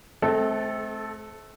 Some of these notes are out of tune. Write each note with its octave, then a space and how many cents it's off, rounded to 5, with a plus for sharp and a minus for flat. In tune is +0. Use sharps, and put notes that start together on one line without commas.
A3 -40 C4 +0 A4 -5